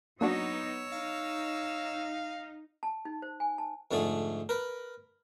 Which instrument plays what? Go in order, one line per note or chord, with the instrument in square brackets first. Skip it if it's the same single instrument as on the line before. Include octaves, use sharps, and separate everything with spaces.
[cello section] F#3 B3 D#4 [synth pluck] A#3 D4 F#4 [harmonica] C#5 E6
[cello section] D#4 [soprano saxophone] F5
[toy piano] A5
D#4
C5
G#5
A5
[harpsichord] F2 G#2 D3 A3 G#4
A#4 B4